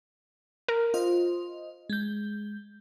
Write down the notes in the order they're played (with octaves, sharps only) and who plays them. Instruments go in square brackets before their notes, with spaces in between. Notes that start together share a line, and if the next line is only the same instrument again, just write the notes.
[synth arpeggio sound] A#4
[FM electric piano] F4 C5 D#5
G#3 G6